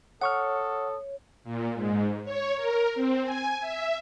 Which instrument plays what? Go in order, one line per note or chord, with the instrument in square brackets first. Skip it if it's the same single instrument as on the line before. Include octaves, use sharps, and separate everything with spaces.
[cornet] A4 [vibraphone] C#5 [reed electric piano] F#5 C#6 F6 [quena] D#6
[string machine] A#2
G#2
C#5
A#4
C4
G#5
E5